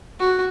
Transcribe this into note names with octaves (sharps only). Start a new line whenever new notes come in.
F#4